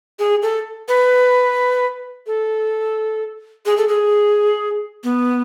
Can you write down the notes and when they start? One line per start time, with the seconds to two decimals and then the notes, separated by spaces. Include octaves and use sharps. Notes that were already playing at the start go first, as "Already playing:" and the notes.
0.19 G#4
0.42 A4
0.88 B4
2.27 A4
3.66 G#4
3.77 A4
3.88 G#4
5.04 B3